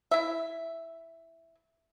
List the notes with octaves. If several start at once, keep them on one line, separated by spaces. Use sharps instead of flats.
E4 E5